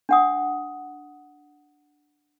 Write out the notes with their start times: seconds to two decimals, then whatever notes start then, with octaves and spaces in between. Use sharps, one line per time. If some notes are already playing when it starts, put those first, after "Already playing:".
0.09 D4 F#5 D#6